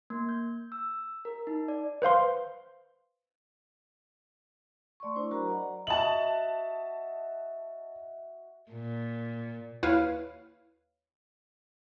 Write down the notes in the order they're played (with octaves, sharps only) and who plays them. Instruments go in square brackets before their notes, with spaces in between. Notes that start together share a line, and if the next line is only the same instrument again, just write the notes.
[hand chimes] A#3
G6
E6
A#4
D#4
D5
[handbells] B4 C5 F5 C6
[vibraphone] A3 D5 C6 C#6
D4 E4 C5
F#3 F#4 A#4 C5 A#5 B5
D5 D#5 F#5 A#5
[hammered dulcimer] F#4 D#5 E5 [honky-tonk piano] A5 F#7
[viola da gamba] A#2
[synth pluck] D#2 E4 B4 C#5 F5 F6